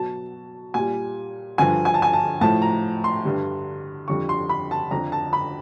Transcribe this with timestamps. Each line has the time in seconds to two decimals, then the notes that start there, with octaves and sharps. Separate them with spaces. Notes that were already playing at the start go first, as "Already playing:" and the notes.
Already playing: B2 F#3 A5
0.74 A#2 G3 G#5
1.58 G2 D3 F3 G#5
1.85 G#5
1.94 A5
2.02 G#5
2.13 A5
2.41 A2 F3 A5
2.62 A#5
3.04 C6
3.24 G2 D3 G3
4.08 F2 D3 G3 C#6
4.29 C6
4.49 B5
4.71 A5
4.91 F2 D3 F3 A#5
5.12 A5
5.33 B5